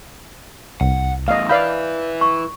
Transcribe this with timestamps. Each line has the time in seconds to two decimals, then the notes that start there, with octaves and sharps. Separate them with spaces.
0.81 C2 F#5
1.28 E2 A2 D#5 F5
1.49 E4 B4 D5 F5 B5 G6
2.21 C#6